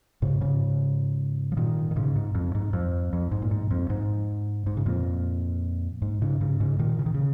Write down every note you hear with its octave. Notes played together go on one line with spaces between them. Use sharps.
G#2 C#3
G#2 C#3
F3
A#2 D#3
D#3
G#2 C#3
G#2
F2
G#2
F2
F2
G#2
A#2
G#2
F2
G#2
G#2
C#3
F2 A#2
G#2
G#2 C#3
G#2 C#3
G#2 C#3
A#2 D#3
C#3
D#3
C#3